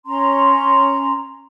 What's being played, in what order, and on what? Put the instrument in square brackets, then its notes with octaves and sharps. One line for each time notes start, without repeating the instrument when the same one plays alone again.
[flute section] C#4 A#5 C6